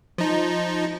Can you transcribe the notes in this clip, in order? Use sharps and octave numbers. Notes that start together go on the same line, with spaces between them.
F3 D#4